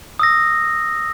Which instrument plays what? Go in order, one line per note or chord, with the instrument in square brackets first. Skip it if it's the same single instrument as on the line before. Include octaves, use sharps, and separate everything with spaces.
[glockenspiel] D#6 E6 A#6